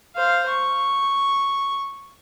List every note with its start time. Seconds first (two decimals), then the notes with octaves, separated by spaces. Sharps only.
0.16 C5 F5
0.50 C#6